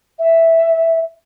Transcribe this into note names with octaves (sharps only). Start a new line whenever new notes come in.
E5